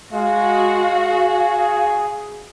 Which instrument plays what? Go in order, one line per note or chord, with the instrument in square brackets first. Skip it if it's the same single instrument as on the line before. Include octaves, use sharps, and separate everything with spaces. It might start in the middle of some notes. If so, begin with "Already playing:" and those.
[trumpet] G#3 [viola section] F#4 [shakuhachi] F5
[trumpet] G#4